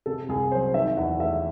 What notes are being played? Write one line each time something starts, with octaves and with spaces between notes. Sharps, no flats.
C3 A4
C2 G#4
F#3 C5
D#3 E5
E2 F#5
A3 E5